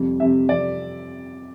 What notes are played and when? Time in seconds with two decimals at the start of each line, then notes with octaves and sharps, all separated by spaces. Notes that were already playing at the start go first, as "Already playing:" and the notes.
Already playing: F2 C3 G3
0.20 F2 C3 G3 E5
0.49 F2 C3 G3 D5